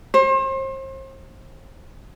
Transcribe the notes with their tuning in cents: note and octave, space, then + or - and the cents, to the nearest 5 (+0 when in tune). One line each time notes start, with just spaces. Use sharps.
C5 +35